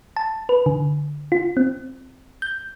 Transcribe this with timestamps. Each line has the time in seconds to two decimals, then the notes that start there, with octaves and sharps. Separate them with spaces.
0.17 A5
0.49 B4
0.66 D3
1.32 F4
1.57 C4
2.42 G6